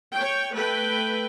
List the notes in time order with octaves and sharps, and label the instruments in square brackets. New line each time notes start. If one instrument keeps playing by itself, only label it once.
[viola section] C#5 G5
A3 B4 G5